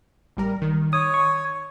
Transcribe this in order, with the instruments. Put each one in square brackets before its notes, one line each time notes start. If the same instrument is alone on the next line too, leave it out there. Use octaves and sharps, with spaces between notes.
[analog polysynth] A1 G3 A#4
D#3
[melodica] C#5 [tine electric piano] D#6
[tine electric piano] C#6